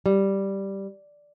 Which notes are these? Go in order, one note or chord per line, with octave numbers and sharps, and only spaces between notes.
G3